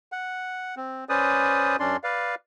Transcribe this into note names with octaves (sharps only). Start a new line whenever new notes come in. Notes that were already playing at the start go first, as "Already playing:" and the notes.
F#5
C4
C#4 B4 C5 D5 D#6
F#2 C#4 D4 D5 C6
B4 D5 F5